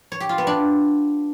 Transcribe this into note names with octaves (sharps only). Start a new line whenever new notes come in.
C#5
G4
F4
B3
D4